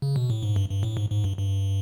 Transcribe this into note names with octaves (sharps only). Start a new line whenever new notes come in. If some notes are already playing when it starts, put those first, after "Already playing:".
C#3
B2
A2
G#2
G2
G2
A2
G#2
G#2
G2
G2